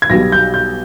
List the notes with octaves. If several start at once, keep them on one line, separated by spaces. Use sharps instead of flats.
G#6
B1 B2 G3 A#6
G6
G6